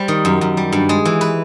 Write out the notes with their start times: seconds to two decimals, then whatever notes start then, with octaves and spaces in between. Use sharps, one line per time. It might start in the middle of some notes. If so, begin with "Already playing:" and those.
Already playing: G3 C5
0.08 D#3
0.25 F#2
0.41 F#2
0.57 G3
0.72 G2
0.89 G#3
1.05 E3
1.21 B4